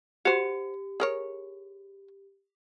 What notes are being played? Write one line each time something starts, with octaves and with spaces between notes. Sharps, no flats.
F#4 G4 C5
G#4 A#4 C#5